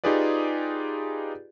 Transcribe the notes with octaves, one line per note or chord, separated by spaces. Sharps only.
D#4 F4 G4 G#4 B4 D5